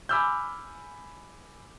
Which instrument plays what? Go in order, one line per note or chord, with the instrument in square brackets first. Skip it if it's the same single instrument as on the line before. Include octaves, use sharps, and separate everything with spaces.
[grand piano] G#5 B5 D6 E6 F6 G6